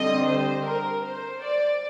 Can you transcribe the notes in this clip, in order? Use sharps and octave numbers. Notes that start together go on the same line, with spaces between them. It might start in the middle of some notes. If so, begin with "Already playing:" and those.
Already playing: D3 G3 C4 D#5
C5
A#4
C5
D5